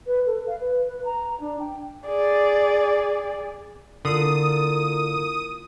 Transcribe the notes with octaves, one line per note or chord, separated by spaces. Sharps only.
B4
A4
F5
B4
B4
A#5
D4
G5
G#4 D5
D3 A#3 E4 F4 D#6